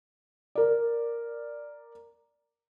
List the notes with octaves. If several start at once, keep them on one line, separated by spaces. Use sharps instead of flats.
A#4 D5